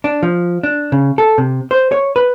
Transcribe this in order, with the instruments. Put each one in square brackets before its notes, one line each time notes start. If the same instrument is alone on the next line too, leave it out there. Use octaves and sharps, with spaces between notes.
[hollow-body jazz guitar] D4
F3
D4
C#3
A4
C3
C5
C#5
B4